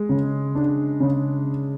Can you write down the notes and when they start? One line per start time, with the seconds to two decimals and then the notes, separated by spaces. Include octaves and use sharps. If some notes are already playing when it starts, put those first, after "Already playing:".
Already playing: G#3
0.09 C#3
0.55 D4
1.00 C#3